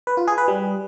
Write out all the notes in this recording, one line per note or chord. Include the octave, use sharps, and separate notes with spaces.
B4
F4
G#4
B4
G3